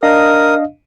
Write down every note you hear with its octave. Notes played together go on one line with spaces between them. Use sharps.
D4 A#4 D#5 F5 D#6